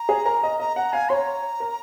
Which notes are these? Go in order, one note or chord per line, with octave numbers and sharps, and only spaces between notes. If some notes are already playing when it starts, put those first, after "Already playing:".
Already playing: A#5
G#4
A#4
D#5
D#5 A#5
F#5 A#5
F5 G#5
C#5 A#5 C6
A#4